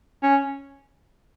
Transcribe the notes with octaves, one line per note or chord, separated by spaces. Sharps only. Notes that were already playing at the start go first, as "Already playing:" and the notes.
C#4